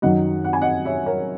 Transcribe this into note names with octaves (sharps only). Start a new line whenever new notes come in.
F#2 D#3 F#3 D#5 F#5
F#5
G#5
D#5 F#5
C#5 E5
A#4 C#5